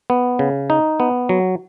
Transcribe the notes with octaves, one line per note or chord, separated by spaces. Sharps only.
B3
C#3
D#4
B3
F#3